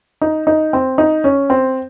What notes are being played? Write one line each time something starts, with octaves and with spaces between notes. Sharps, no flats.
D#4
D#4
C4
D#4
C#4
C4